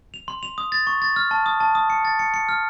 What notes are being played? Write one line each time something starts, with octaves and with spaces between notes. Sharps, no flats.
F7
C6
F7
D#6
A6
C#6
A6
F6
A5
D#6
A5
D#6
C#7
A6
C#7
C#7
F6